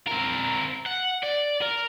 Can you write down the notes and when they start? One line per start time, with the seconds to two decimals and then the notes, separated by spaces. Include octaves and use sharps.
0.08 C4 A#4
0.86 F#5
1.23 D5
1.61 A#4